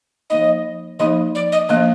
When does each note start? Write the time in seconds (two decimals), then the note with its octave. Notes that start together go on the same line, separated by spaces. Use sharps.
0.30 F3 A#3 D#4 D#5
0.99 F3 A#3 D#4 D#5
1.35 D5
1.52 D#5
1.69 F3 A#3 D4 D#5